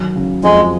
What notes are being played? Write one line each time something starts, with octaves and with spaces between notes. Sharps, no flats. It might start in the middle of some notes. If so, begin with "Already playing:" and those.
Already playing: D#3 F#3
C#3
F2 G#3